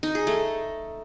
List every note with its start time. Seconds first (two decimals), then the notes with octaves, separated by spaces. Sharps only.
0.03 D#4
0.15 G#4
0.27 A3